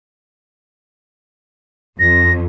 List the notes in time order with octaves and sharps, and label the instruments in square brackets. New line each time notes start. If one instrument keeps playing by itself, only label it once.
[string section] F2 [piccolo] A#6